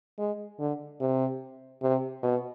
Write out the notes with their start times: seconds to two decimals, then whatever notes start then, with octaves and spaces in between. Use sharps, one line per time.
0.19 G#3
0.59 D3
1.01 C3
1.82 C3
2.23 B2